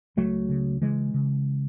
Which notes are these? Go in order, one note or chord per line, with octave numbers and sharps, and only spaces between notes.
C#2 F#3 A3
C#3
C#3 E3 G#3
C#3